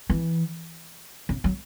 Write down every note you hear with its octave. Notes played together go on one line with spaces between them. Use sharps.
E3
C#3
F#3